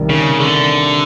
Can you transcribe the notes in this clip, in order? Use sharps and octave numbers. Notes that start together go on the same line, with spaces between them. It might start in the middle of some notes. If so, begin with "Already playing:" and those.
Already playing: C2 C3 D#3 G3
C#3
D3